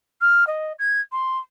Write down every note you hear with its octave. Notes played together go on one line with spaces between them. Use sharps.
F6
D#5
G#6
C6